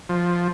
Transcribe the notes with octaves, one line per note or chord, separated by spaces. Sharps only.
F3